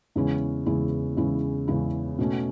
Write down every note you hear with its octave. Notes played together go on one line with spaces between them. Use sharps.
E2 C#3 G#3 C#4 E4
E2 C#3 G#3 C#4 E4
E2 C#3 G#3 C#4 E4
E2 C#3 G#3 C#4 E4
B2 A3 C#4